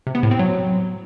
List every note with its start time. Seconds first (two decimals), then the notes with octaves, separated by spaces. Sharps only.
0.07 C3
0.15 B3
0.23 A2
0.31 C4
0.39 F#3